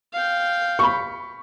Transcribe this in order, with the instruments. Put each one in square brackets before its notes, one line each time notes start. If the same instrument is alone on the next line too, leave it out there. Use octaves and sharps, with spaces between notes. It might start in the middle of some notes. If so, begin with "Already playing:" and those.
[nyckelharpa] F5 G5
[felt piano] B5 C#6